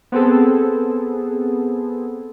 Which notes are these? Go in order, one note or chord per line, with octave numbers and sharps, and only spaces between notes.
B3 C4 G#4 A4